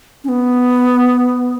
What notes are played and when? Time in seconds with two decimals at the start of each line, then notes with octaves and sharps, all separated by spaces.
0.24 C#4
0.29 B3